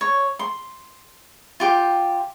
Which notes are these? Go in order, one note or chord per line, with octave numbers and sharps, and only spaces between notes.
C#5
C6
F4 G4 G5